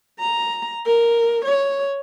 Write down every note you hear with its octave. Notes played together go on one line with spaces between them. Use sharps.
A#5
A#4
C#5